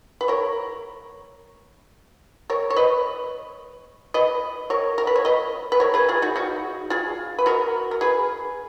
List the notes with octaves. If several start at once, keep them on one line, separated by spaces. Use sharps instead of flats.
B4
A#4 C#5
A#4 C#5
C#5
B4 D#5
B4 D#5
A#4 C#5
A#4
B4
C#5
B4 D#5
B4
A#4 C#5
G#4 B4
F4 G#4
D#4 F#4
D#4 F#4
F4 G#4
B4
F#4 A#4
A#4
G#4 B4